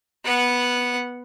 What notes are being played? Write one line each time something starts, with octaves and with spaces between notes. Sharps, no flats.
B3 F#5